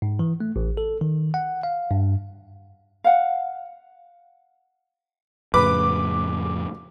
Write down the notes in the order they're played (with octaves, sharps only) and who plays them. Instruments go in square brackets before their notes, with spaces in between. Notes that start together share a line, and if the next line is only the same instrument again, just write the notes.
[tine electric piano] G#2
E3
A3
A1
A4
D#3
F#5
F5
G2
[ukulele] F5 F#5
[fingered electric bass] F2 A2 C#3 [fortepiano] B4 B5 [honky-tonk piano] D6